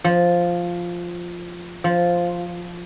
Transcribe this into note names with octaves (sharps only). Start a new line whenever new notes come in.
F3
F3